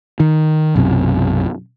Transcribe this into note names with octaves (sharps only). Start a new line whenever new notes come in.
D#3
B1 F#2 C3